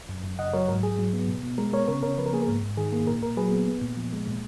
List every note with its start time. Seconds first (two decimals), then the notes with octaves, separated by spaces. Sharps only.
0.09 F#2
0.24 F#2
0.39 C#3 D#5 F#5
0.53 F#3 A#4 C#5
0.68 G#2 A#4
0.83 G#2 G#4
0.99 F#3
1.13 B3
1.28 B2
1.43 B2
1.58 G#3 A#4
1.73 B3 A#4 C#5
1.88 C#3 A#4 C#5
2.03 C#3 A#4 C#5
2.18 F3 B4
2.26 A#4
2.33 A#3 G#4
2.42 A#4
2.48 G#2
2.63 G#2
2.77 D#3 G#4
2.92 A#3 G#4
3.07 A#2 A#4
3.22 A#2 A#4
3.37 F#3 G#4 B4
3.52 B3
3.68 B3
3.81 A#2
3.97 F3
4.12 G#3
4.27 A#2